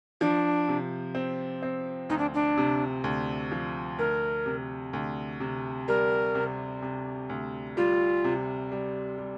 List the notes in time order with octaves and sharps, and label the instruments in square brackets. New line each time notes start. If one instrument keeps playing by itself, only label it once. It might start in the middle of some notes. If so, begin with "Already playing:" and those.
[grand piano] F3 [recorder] D4
[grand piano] C3
C4
C4
[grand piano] D2 [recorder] D#4
[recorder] D4
D4
[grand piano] C3
D2
F3
[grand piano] D2 [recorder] A#4
[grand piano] C3
D2
C3
[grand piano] G3 [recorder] A#4
[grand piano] C3
C3
D2
[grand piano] G3 [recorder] F4
[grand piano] C3
G3
G3